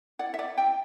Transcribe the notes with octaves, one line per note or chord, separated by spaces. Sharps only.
E4 D5 F#5
E5
D5 F#5
E4
E5 G5